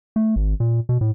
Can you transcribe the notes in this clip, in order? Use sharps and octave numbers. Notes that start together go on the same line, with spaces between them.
A3
G#1
A#2
B2
A2